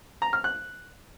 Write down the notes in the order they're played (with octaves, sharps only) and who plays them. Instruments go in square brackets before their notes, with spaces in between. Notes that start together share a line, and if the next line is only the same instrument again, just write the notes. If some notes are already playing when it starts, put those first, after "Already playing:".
[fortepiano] A#5
F6
F#6